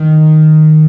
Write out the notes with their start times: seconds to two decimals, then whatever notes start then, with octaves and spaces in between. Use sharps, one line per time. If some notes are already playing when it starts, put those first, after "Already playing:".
Already playing: D#3